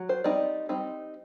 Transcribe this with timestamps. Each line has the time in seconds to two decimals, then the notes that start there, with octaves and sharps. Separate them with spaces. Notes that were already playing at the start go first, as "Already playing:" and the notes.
Already playing: F#3
0.09 C5
0.24 G3 C4 D#4 D5
0.69 G3 C4 D#4